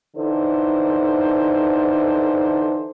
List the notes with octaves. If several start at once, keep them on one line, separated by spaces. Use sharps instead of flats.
D3 E3 D#4 A4 C5